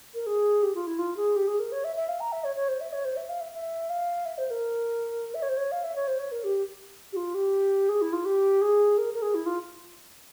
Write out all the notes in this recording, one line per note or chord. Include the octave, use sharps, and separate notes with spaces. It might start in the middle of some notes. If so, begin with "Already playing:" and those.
A#4
G#4
G4
F4
E4
F4
G#4
G4
G#4
A#4
C#5
E5
E5
F5
A#5
E5
C#5
C#5
C5
E5
C#5
C5
E5
F5
E5
E5
F5
E5
C5
A#4
E5
C#5
C5
C#5
F5
E5
C#5
C5
C#5
A#4
G4
G4
F4
G4
G#4
E4
F4
G4
G#4
A#4
A#4
G#4
E4
F4